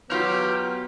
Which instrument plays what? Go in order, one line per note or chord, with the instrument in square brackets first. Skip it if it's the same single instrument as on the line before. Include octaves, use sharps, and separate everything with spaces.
[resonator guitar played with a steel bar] F#3 F4 C#5 [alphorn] B3 [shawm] G4 [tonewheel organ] A#5 F6 G6